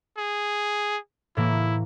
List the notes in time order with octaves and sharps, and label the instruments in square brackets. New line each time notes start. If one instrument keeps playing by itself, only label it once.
[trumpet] G#4
[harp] A2 E3 A#3 [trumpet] E4